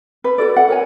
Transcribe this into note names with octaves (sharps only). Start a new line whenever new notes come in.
B4
F#4 A4 D5
F#5
A#4 C#5 G#5